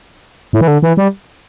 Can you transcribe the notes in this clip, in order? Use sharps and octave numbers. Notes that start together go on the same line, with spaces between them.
A2
E3
D3
E3
G3